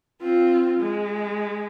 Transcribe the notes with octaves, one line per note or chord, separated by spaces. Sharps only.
C4 F4
G#3